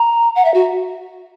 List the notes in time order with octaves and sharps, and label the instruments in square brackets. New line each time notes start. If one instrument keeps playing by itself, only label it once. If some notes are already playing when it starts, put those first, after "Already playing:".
Already playing: [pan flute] A#5
F#5
E5
F#4